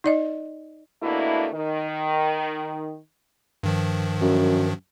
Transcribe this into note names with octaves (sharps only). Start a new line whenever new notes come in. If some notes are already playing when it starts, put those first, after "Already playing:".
D#4 D5 D#5
B2 A3 A#3 D4 E4
D#3
G2 D#3 F3
F#2